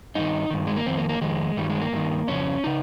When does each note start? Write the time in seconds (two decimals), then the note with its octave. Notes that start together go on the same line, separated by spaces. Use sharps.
0.15 G2 D#3 D#4
0.50 G2 D#3
0.67 G#3
0.76 A#3
0.86 F2 D#3 C4
0.97 A#3
1.09 A#3
1.21 F2 D#3 G#3
1.57 G2 D#3 G3
1.69 G#3
1.81 A#3
1.93 G2 D#3
2.28 F2 C#3 C#4
2.64 C#3 D#4